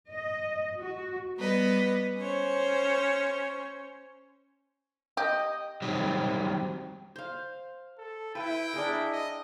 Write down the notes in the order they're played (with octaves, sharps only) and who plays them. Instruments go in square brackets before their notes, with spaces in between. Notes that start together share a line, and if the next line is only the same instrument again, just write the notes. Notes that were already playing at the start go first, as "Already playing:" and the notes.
[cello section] D#5
F#4
[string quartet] G3 B3 B4 D#5
C#4 C5 C#5
[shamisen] G4 [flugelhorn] D#5
[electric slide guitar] D#3 F#3 G3 C4 G4
[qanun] C5 F5
[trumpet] A4
[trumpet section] E4 [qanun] B4 [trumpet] G5
[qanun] D4 G#4 A#4
[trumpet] D#5